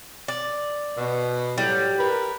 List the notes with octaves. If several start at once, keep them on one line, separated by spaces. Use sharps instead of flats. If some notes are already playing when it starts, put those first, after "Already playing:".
D5
B2
A2 F#3 G3
A#4 B4